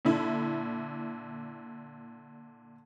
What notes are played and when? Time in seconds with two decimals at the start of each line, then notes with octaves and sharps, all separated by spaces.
0.05 A#2 D3 E4